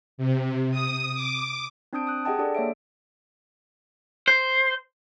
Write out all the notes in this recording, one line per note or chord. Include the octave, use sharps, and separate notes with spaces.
C3
D#6
D6
C4 D4 A5 D#6 G6 D7
D#6 F#6
G4 G#4 D#5 F#5 G5 A5
D4 G4 A4 D5
A#3 C#5 E5 D7
C5